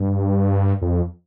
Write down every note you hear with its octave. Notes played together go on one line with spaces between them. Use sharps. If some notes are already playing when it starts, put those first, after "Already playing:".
Already playing: G2
F2